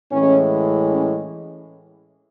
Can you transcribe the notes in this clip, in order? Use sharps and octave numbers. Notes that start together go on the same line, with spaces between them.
A2 E3 G#3 C#4
C#4